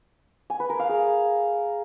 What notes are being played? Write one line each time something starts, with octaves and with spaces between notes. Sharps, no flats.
G#5
B4
A#4
F5
G#4